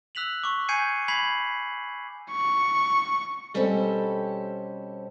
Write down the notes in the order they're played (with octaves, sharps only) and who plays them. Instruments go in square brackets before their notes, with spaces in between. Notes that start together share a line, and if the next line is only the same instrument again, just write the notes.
[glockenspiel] E6 F#6 B6 F7 F#7
C#6 D6
G#5 G6 G#6 C7 C#7 D#7
B5 G#6 B6 C7 F#7
[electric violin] C#6
[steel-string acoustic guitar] B2 G3 C4 C#4 G4 A4